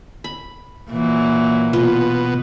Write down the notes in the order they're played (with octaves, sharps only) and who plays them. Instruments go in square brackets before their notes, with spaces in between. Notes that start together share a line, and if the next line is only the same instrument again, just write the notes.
[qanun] B5
[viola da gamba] A#2 E3 F#3
[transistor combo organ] B2 [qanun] F4